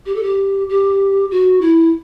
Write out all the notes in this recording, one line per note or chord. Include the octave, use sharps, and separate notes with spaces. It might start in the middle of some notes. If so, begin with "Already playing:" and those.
G4
A4
G4
G4
F#4
E4